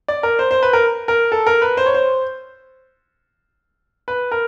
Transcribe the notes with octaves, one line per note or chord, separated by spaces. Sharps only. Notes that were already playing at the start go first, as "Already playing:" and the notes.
D5
A#4
C5
C5
B4
A#4
A#4
A4
A#4
B4
C5
C#5
C5
B4
A#4